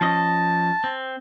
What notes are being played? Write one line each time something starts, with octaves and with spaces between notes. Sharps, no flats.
F3 C#4 D#5 A5
C4